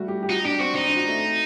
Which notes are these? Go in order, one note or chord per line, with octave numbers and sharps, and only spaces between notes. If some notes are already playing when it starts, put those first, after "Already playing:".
Already playing: G3 A3 F#4
G4
G4
D#4 F#4
D4 G4
C4 F#4
C4 D#4
D4
F#4
A3